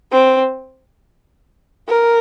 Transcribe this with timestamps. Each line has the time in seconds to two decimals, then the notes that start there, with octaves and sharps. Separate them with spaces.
0.12 C4
1.89 A#4